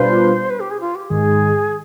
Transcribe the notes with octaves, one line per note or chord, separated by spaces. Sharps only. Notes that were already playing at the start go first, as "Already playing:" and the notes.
Already playing: B2 G3 D4 F4 B4 C5
B4
G4
G#4
F4
G4
G#2 D#3 G#3 G#4